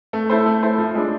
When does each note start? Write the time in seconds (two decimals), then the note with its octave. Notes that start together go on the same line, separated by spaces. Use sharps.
0.13 A3
0.30 E4 A4 C5
0.46 A3
0.63 E4 A4 C5
0.78 F3
0.95 G#3 D4